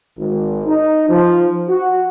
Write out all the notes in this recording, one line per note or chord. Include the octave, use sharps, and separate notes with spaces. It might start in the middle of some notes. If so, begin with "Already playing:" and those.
G#1
D#4
F3
F#4